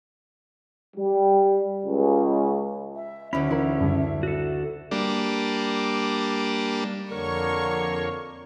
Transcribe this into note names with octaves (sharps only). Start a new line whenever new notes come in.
G3
C#2
E5
D2 C#4 E4 E5 B5
E3 E4 A#4
F#2 C#3 G3
F#4 A4
G3 A#3 D4
F2 D3 A#3 A#4 C#5 C#6